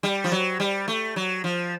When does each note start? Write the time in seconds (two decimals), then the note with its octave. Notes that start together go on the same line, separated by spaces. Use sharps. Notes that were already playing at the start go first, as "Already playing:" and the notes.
0.03 G3
0.24 F3
0.32 F#3
0.60 G3
0.88 A3
1.16 F#3
1.44 F3